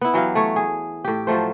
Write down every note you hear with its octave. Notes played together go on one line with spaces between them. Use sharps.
B3 E4
E3 F#3 G4 F5
A3 C#5
G#4
A2 G4
F3 F#3 A3 C5